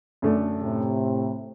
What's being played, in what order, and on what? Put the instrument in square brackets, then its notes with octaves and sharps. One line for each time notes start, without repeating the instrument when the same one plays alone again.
[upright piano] F#2 D3 A3 D4
[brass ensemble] A2 C3